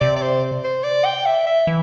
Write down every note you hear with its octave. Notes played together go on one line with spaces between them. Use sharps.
C3 D5
D5
C5
C5
D5
G5
E5
E5
E3